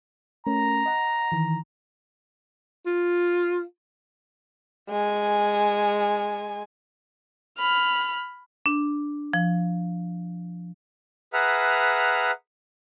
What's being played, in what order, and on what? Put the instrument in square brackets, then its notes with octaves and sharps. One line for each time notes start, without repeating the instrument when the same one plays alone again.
[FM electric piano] A3 C#4 A#4 [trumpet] A#5
[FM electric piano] D#5 F#5
D#3 E3
[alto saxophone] F4
[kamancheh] G#3 G#5
[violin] B5 F6
[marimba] D4
F3
[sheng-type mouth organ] G#4 B4 E5 F#5 A#5 F6